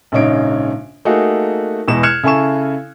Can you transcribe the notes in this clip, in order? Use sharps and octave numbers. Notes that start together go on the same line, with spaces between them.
A#1 G#2 C#3 D#4 C#5 D7
A3 A#3 D#4 F#4 G#4
E2 B2 G#3 E7
F6 F#6 G#6 C#7 E7 F7
C#3 E4 A4 G#5 C#6 E7